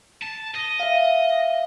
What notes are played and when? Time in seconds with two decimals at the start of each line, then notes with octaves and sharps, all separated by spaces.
0.22 A5
0.55 D#5
0.80 E5 F5